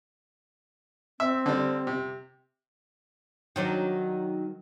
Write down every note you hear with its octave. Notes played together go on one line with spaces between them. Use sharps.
C4 E5
D3 G3
C3
D#3 F#3 D4